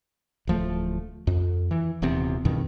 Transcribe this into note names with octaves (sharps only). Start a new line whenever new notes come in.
D1 F3 A3
F2
E3
D#1 E2 C3 C4
E2 G2 B2 D#3